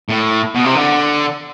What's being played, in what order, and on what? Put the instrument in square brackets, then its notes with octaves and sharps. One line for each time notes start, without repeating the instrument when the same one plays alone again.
[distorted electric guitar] A2
B2
C3
D3